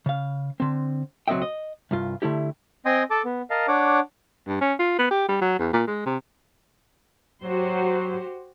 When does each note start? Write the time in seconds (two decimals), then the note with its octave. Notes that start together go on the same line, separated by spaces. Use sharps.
0.06 C#3 F5
0.60 D3 C4
1.28 C#2 F#3 C4 D#5 E5 G5
1.42 D#5
1.91 C2 G2 F4
2.22 D3 A3 E4 G4
2.86 C4 D#5 G5 G#5 C6 D#6
3.10 A4 A5 D6
3.25 B3
3.50 A#4 D#5 F5 A5
3.68 D4 C#5 F#5 D6
4.48 G2
4.61 C#4
4.79 F4
4.98 B3
5.11 G4
5.29 G3
5.41 F#3
5.59 E2
5.73 A#2
5.87 G#3
6.05 C3
7.42 F#3 F#4 G4 C5